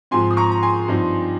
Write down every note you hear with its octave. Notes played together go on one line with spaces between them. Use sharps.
G#2 F3 C4 G#5 C6
D#6
A#5 C#6
A#5
G#5 C6
G2 F3 C4 D#4